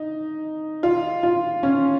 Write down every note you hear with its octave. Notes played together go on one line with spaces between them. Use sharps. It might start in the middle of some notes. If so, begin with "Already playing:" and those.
Already playing: D#4
F4
F4
C#4